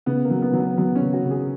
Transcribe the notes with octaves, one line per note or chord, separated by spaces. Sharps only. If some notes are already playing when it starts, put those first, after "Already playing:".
C#3 B3
A#3
F#3
B3
F#3
B3
F#3 B3
C#4
C#3
F#4
C#3
G#4